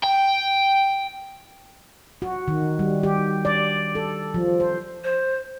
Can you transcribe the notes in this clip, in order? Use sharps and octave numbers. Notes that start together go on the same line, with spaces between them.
G5
F#4
D#3
G3
G4
D5
A4
F3
C5
C5